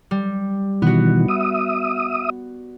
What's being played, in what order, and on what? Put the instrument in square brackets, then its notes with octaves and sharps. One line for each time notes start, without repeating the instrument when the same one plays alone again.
[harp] G3
[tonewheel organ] B2 D#3 E3 [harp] B3 F#4
[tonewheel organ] E5 D#6